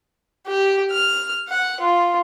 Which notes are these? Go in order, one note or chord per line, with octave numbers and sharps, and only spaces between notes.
G4
F6
F#5
F4